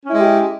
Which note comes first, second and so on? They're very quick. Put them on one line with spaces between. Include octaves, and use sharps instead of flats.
C#4 E4 G#3 G4